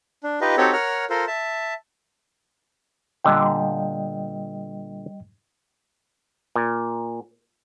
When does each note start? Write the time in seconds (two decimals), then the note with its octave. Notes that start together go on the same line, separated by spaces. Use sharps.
0.24 D4
0.41 D#4 F4 G4 B4 D#5
0.57 C4 D#4 F#4 G4 A4 C#5
0.73 A#4 C#5 F#5 F6
1.10 F4 A4 A#4 C5
1.27 E5 A5
3.25 A#2 D3 G3 B3 D#5 G5
6.56 A#2